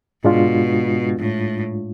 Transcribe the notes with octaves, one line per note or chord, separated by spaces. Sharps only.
G#2 B2 G#3 D4 F4
A2